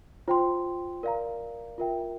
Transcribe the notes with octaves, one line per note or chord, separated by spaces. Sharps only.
F4 C5 G5 C6
A#4 D5 F5 A#5
F4 A#4 E5 G5